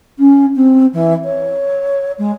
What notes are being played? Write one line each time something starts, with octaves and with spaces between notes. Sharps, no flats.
C#4
C4
E3
C#5
G#3